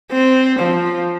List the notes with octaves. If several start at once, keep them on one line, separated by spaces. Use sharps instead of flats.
C4
F3